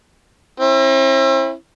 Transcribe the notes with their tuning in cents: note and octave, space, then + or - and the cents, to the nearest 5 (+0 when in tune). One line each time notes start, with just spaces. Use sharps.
C4 +45 E4 +0